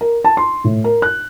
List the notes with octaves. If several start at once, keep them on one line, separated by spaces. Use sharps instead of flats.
A#4
A5
C6
A2
A#4
F#6